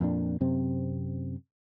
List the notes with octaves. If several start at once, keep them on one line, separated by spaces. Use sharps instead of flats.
F2 A#2 D4
F#2 C3 C4